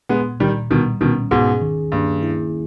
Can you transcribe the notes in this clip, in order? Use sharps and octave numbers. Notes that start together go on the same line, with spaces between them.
A#2 G#3 B3
A#2 D#3 G3
B2 D#3 G3
B2 D#3 C#4
G#2 B2 G#4
D#3
G2 A#3
E4